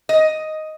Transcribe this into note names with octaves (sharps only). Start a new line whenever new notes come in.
D#5